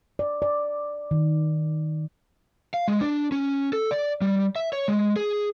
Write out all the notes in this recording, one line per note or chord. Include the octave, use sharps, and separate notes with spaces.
D5
D5
D#3
F5
G#3
D4
C#4
A4
D5
G3
E5
C#5
G#3
G#4